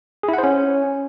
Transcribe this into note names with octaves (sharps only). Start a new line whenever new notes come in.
G#4
E4
F#5
C5
C#4